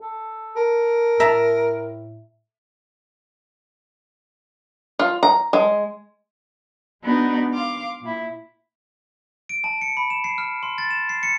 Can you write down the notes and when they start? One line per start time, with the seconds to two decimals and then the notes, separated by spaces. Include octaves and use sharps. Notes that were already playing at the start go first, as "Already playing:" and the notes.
0.01 A4
0.56 A4 A#4
1.20 A2 E5 A5 A#5
4.99 F4
5.23 A#5
5.53 G#3
7.02 G#3 B3 D4 D#4 F#4 D5
7.52 F5 C6 D6 F6
8.01 A#2 E4
9.49 D7
9.64 A5
9.81 C#7
9.97 B5
10.10 E7
10.24 C7
10.38 F6
10.63 C6
10.78 A6
10.91 E7
11.09 C7
11.23 C#7